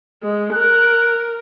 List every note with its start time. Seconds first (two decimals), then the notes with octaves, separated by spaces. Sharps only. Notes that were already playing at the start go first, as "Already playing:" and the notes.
0.23 G#3
0.54 A#4 F#6